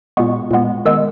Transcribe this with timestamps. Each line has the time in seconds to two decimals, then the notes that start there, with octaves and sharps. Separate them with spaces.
0.17 A#2 G#3 B3 C#6
0.51 A#2 G#3 B3
0.85 D#3 G#3 B3 E6